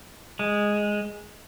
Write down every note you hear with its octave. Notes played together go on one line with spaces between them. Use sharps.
G#3